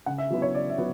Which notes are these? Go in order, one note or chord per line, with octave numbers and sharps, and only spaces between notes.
C#3 F#5
E5
F#3 B3 E4
C#5
C#3 D5
E5
F#3 B3